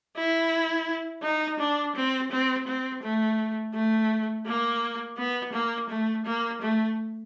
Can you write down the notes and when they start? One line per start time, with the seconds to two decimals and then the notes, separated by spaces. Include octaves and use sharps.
0.16 E4
1.22 D#4
1.59 D4
1.95 C4
2.31 C4
2.67 C4
3.03 A3
3.73 A3
4.46 A#3
5.17 B3
5.53 A#3
5.89 A3
6.25 A#3
6.61 A3